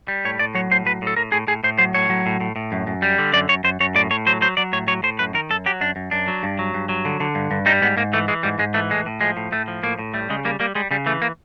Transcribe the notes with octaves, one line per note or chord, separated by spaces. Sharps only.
G3
A2 C#5
A2 D5
F#3 C#5
A2 C5
F#3 B4
A2 A4
A2 A#4
A2 G#4
A2 G#4
A2 C5
F#3 C5
A2 C#5
F#3
A2
A2
A2
F#2
F#2
G3
D3
F#2 D5
F#2 C#5
F#2 C5
F#2 C#5
A2 D5
A2 C#5
F#3 C5
F#3 C5
F#3 D5
A2 C#5
F#3 C#5
A2 C5
F#2 B4
D#3 A#4
F#2 A4
F#3 G4
F#2 D4
F#2
F#2 D4
F#3
G2
F#3
G2
F#3
D3
D3
G2
G2
G3 D#4
G#2 B3
G#2 A#3
E3 A3
E3 G#3
G#2 G3
G#2 G#3
E3 A3
A2 G#3
A2
F3 G#3
A2
A2 A3
F3
A2 A#3
A2
G3 A3
C#3 G#3
G3 A#3
G3 A#3
G3 G#3
C#3 G3
E3 A3
A#3